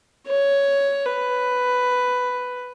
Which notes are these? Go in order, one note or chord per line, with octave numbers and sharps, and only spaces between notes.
C#5
B4